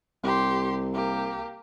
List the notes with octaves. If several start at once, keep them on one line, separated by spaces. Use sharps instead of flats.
C2 G4 C6
A#3 G4